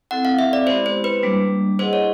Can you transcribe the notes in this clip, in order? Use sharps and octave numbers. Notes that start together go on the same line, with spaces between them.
C4 E4 A4 F#5
F5
E5
D5
G#3 B3 E4 G4 C5
C5
B4
G3 A#3 D4
E4 G#4 B4 C5 D#5 F#5
C#5